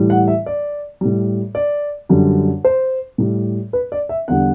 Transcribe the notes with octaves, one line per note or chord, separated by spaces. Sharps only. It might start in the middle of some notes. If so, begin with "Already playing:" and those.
Already playing: A2 E3 G3
F#5
E5
D5
A2 G3
D5
F#2 D3 G3
C5
A2 G3
B4
D5
E5
E2 D3 G3 F#5